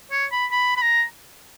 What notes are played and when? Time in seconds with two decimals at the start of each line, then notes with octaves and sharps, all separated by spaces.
0.11 C#5
0.32 B5
0.52 B5
0.77 B5
0.82 A#5